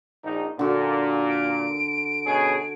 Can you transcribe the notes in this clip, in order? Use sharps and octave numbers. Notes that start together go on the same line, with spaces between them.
A#1 D#4
A#2 D3 F#4
D7
B2 C#4 G#4